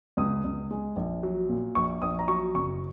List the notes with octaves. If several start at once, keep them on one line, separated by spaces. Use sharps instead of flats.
C#2 D#6
C#2
G#3
A#1
F#3
A#2
A#1 C#6
A#1 D#6
A#5
F#3 C#6
F#1 C#6